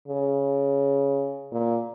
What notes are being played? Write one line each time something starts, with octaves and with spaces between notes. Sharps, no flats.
C#3
A#2